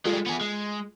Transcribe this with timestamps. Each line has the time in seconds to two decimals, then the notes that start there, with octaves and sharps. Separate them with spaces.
0.05 G3 G#3 F4 A4
0.26 B3 G#4
0.41 G#3